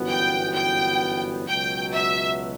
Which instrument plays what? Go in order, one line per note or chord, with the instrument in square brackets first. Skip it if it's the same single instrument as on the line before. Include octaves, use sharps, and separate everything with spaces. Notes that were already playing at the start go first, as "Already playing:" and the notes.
Already playing: [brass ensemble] G1 F#2 E3 B3 F#4
[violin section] G5
G5
[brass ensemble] C#2 B2 F#3 [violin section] G5
[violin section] E5